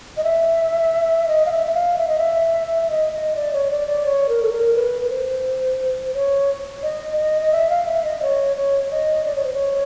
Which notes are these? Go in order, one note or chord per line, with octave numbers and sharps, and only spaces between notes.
D#5
E5
D#5
F5
E5
E5
F5
E5
D#5
E5
E5
D#5
D#5
D5
C#5
D5
D5
C#5
A#4
A4
A#4
B4
B4
C5
C#5
D#5
D#5
D#5
E5
F5
E5
D#5
C#5
C#5
D#5
D5
C#5
C5
C#5